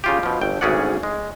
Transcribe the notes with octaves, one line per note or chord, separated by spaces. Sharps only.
C#3 F4 G4
B2 F3
G1 G5
G#1 D2 C#4 G#4 D5 F#5
G#3